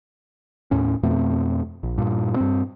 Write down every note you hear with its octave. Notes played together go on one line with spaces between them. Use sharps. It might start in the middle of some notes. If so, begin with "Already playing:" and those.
D#2 A2 C#4
F2 B2 A3 C4
A#1
G2 A#2
G2 C4